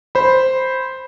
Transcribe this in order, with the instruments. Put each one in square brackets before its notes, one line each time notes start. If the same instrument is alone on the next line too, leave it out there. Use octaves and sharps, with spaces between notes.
[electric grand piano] C5 B5